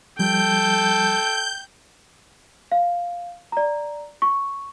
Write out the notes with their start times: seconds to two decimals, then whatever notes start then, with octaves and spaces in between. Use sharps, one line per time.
0.19 F3 G3 A4 G5 G6
2.72 F5
3.52 D5 A#5
4.22 C#6